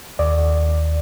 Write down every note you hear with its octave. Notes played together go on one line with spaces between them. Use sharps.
D#2 D5